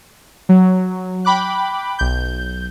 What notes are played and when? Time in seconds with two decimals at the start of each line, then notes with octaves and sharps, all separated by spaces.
0.49 F#3
1.25 G5 B5 D6 F#6
1.99 B1 G6